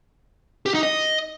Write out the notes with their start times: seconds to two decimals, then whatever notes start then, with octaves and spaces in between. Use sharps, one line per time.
0.66 G4
0.74 D#4
0.83 D#5